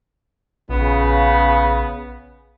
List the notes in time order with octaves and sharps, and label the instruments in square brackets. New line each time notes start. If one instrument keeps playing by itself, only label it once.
[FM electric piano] A#1 [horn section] C#3 B3